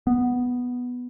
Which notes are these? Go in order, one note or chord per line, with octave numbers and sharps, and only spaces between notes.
B3